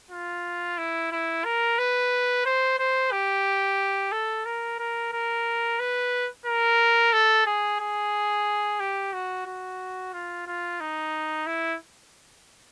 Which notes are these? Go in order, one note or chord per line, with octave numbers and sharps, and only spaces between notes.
F4
E4
E4
A#4
B4
C5
C5
G4
A4
A#4
A#4
A#4
B4
A#4
A4
G#4
G#4
G4
F#4
F#4
F4
F4
D#4
E4